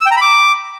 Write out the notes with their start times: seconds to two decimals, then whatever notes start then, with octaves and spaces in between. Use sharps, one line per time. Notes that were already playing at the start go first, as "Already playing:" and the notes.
0.01 E6
0.06 G5
0.11 A#5
0.16 B5
0.21 D6